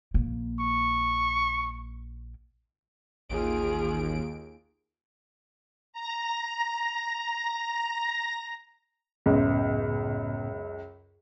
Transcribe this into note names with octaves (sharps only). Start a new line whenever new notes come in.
A#1 A#3
C#6
A1 D#2 F4 G#4 D7
A#5 A#6
C#2 F#2 A2 C#3 B3